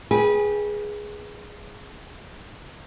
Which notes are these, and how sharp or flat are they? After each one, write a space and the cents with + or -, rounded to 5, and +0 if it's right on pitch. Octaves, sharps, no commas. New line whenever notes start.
G#4 +0 B4 -25 G5 +5